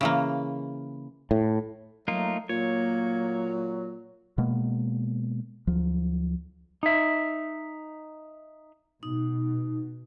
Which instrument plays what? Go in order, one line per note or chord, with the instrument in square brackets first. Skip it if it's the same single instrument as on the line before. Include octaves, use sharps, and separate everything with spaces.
[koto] C#3 E3 A#3
[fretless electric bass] A2
[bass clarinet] F#3 [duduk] A3 [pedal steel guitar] A#3 D#4 F4
[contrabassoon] A#2 [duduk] F#3 [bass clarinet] A#3 [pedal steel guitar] C#5
[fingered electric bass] B2 G#3 A#3 B3
D2 F3 F#3
[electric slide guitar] D#4 E5
[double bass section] B2 [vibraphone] D#4